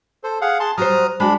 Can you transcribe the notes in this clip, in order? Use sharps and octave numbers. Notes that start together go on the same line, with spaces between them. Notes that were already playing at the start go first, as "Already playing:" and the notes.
A4 C5
G#4 F5 F#5
G#4 A5 C6
F#3 G3 C5 A#5 D#6 F6
G#3 D4 F#4 B5